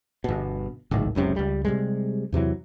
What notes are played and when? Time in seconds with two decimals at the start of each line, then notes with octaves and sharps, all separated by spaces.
0.24 G1 B2
0.91 D1 G#1 C#2 D#3
1.15 F#1 C#2 F#2 C3
1.36 C#2 G3
1.65 C3 G3 G#3
2.32 E2 C3 E3 F#3